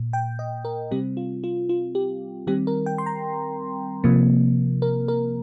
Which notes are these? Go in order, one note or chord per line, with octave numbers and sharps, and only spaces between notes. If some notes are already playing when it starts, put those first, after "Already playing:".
Already playing: A#2
G5
D#5
A#4
C3 G3 C4 G4
F4
F4
F4
G4
D#3 G3 C4 G4
A#4
G5
C6
A#5
C3 F3 A#3
A#4
A#4